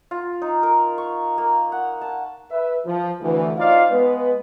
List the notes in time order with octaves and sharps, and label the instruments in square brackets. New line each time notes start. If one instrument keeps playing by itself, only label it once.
[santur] F4
D#4
A#4
C#6
A#3
F#5
A5
[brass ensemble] B4 E5
F3
D2 E3
D#4 F4 C5 D5 F5
G#3 B3 B4